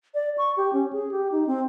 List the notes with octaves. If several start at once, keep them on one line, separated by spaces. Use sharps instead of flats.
D5
C#6
G4
C#4
G#4
G4
D#4
C4